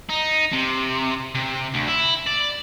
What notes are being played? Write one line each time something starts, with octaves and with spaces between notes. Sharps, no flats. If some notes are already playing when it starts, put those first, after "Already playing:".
D#4
C3
C3
D2
E4
D5